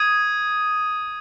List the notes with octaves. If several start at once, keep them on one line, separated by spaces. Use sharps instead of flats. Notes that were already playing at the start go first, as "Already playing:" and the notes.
Already playing: D#6 G#6 D#7